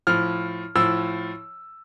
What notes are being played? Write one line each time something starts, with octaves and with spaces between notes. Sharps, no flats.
A2 F3 F6
A2 F3 E6